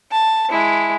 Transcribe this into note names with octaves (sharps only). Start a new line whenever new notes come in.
A5
G#3 E4